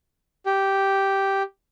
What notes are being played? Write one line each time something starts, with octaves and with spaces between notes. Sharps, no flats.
G4